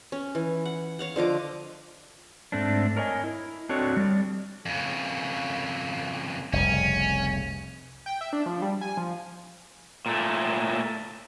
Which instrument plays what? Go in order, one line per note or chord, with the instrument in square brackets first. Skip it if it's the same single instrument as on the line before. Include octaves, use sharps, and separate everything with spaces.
[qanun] C#4
E3
F#5
C#5 F5 F#5
D3 F3 D#5 D6
[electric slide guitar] G#2 A3 C4 D4
A#4 C#5 D#5 G#5
E4
C4 D4 F#4 A4 C#5 D#5
G3 D5
[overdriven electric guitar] F2 C#3
[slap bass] F1 C2 C#3 [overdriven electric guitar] C#4
[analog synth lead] G5
E5
D4
F3
G3
G#5
F3
[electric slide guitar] A#2 A3